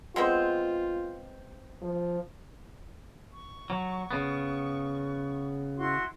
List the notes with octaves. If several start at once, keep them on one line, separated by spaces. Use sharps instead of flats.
G#3 B3 C4 F4
F3
C#6
F#3
C#3 B3
E4 F#4 C6